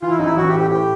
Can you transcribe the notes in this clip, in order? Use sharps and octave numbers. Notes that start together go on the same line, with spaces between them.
E3 F4
E4
A1 D#4
E4
A1 F#4
G4
A2
G4
A2 G4